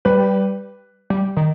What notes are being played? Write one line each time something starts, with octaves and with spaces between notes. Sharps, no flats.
G3 B4
G3
D#3